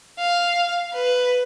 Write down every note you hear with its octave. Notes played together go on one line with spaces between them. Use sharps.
F5
B4